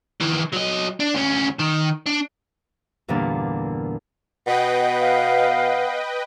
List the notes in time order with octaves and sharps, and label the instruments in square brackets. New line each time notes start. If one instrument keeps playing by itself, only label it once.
[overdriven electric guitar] D#3 E3
F#3 D#5
D4
D2 C#4
D#3
D4
[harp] E2 G2 A#2 D3 A#3 D4
[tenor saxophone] B2 [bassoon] B3 [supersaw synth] B4 D#5 G5
[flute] F5